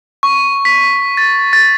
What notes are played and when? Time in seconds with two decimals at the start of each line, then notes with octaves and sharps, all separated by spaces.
0.23 C#6
0.65 B6
1.17 A6
1.53 A6